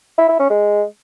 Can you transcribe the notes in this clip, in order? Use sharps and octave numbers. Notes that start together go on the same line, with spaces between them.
E4
E4
C#4
G#3